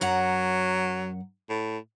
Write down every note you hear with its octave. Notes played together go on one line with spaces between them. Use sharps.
F#2 F#3 F#5 A#5
A2